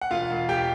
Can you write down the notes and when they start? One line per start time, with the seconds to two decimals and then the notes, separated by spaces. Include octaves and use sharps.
0.01 F#5
0.11 E1 F4 F5
0.30 E1
0.49 E1 G4 G5